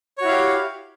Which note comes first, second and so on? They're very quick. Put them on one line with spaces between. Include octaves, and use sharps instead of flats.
C#5 F#4 E4 F5 G4